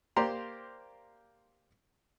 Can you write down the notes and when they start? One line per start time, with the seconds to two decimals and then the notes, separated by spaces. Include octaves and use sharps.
0.16 A#3 G4 C5 D5 A#5 C6